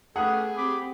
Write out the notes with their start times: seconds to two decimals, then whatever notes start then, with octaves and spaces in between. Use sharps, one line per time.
0.16 A3 B3 C#4 G4 G#4 F#5 D#6
0.57 C4 G4 B5 D6